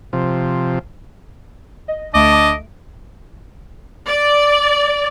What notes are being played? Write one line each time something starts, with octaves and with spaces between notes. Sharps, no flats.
C3 F3
D#5
D2 D3 A3 D#5 A5 D6 D7
D5